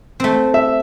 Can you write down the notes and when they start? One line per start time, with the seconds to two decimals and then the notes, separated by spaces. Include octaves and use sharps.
0.20 A3 C4
0.54 E5